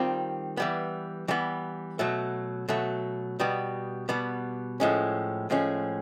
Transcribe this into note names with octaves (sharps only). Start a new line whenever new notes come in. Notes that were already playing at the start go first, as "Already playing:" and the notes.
Already playing: D#3 G3 C4 F4
E3 G3 B3
E3 G3 B3
B2 F#3 A3
B2 F#3 A3
B2 G3 B3
B2 G3 B3
A2 F3 G#3 C#4
A2 F3 G#3 C#4